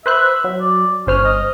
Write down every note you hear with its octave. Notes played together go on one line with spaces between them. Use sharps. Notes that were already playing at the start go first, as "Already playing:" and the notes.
B4 C5 E5 F#6
F#3
D5
G1 C#4 C5 F6
D#5